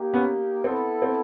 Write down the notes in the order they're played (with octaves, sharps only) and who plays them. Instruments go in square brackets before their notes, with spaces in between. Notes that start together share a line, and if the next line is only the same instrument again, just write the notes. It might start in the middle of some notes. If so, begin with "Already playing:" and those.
Already playing: [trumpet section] A#3 D#4 G4
[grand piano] B3 C#4
[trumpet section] B3 E4 A4 [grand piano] C4
[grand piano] C4